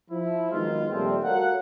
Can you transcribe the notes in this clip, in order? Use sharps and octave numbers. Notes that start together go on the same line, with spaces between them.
F3 E4
D#3 F#3 G#3 B3 D#4 F4
A#2 D#3 F3 G3 A3 C4
F#4 A4 A#4 C#5 F5 F#5